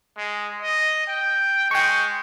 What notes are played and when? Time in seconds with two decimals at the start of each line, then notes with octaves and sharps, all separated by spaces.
0.17 G#3
0.62 D#5
1.07 G5
1.71 G#3 G5 C#6